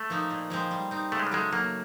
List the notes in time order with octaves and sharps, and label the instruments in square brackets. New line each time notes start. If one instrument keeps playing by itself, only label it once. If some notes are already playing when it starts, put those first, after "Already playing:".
Already playing: [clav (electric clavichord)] A3
[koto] F3 A#3 D#4
A#2
F3 G#3 C4
G3
C4 D#4
[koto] C#3 [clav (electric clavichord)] A3
[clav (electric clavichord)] G#3
G3
[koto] F#3 A3 C#4 [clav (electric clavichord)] G#3
[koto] F#3 [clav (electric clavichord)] A#3